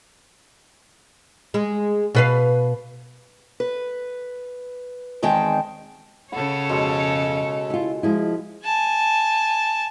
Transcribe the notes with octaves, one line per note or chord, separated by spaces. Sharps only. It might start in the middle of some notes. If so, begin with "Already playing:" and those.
G#3
B2 B4 F5
B4
E2 D#3 G#3 C4 G5 A5
C#3 A4 C#5 F#5 B5
F2 B2 G#3 G#4
E4 F4
F3 G#3 E4
G#5 A5